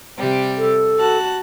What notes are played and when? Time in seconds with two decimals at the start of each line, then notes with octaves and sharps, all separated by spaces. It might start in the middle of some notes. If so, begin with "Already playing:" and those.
0.18 C3 G3 G4
0.57 A4
0.98 F#4 A5 F#6